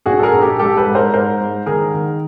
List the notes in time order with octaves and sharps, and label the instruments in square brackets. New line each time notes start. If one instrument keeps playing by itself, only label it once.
[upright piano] A#1 F#4 G#4
A4
G#4 A#4
A#1
G4 A4
G#2 G4 A4
A4 B4
G#2
A#4 C5
G#2 A#4 C5
G#2
D#3 G#4 A#4
D#3